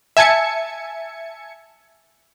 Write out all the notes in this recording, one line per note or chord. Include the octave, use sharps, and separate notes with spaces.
E5 G#5 A5 G#6 C#7